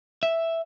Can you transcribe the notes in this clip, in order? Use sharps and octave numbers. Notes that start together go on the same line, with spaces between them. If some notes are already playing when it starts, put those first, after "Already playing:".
E5